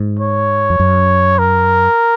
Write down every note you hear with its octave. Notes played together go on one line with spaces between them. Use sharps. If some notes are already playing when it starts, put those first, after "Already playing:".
Already playing: G#2
C#5
F2
F#2
A#4